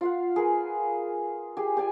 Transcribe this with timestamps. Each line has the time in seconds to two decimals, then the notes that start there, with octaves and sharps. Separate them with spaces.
0.01 F4 F5 F#5
0.36 G#4 A#4 B4
1.57 G4 G#4
1.77 G4 D5 G#5